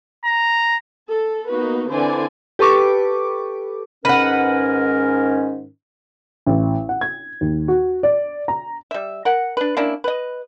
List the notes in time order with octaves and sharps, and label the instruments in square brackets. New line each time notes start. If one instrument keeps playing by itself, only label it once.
[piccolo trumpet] A#5
[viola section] A4
A#3 B3 D#4 F#4 B4
D3 E3 C4 C5 D5 G#5
[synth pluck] G4 A4 B4 C#6 D6
[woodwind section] G#2 D#3 C#4 [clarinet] A#4 [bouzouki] B4 F#5
[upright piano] A1
F#5
G#6
D#2
F#4
D5
A#5
[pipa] G3 E5
A#4 F#5
D4 B4
A#3 C#4 D4 E4
B4 D#5